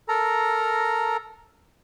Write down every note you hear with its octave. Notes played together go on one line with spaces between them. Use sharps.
A4 A#4 A#5